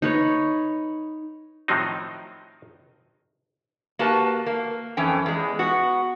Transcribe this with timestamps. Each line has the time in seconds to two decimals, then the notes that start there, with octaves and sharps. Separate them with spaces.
0.02 D#4 B4 C#5
1.68 A2 D#3 F3 F#3 C4 D#4
3.99 A#3 F#4 G4 B4 A5
4.46 A#3
4.97 F2 E3 C#4 G5
5.26 E2 G#3
5.59 B3 F#4